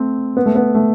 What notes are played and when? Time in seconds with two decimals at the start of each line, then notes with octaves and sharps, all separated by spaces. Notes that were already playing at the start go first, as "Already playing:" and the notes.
Already playing: A3 C4
0.37 B3
0.46 A3
0.55 B3
0.75 A3